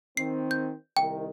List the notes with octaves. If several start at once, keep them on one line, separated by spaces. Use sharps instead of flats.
D#3 C4 C7
G6
C2 C3 D#3 G5